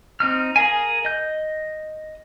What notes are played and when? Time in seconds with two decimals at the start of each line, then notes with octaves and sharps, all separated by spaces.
0.20 C4 D#4 F6
0.56 G#4 A#4 F5 G#5
1.05 D#5 G6